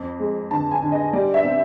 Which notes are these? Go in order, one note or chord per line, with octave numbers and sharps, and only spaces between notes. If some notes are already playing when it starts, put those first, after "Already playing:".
Already playing: F2
G#3
D3 A5
G#5
D3
D#5
G3 D5
E5
C4